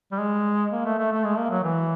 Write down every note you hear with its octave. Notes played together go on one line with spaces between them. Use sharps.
G3
G#3
A#3
A3
A3
A3
G#3
A#3
F#3
E3